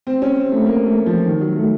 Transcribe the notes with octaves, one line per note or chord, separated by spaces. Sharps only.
C4
C#4
C4
A3
A#3
A3
F3
D#3
F#3
A3